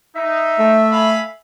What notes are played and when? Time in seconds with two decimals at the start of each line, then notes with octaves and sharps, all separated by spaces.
0.16 D#4 E5
0.59 A3
0.92 F5 G#5 B5